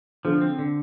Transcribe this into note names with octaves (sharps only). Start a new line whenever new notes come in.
D3 F3
C4
D3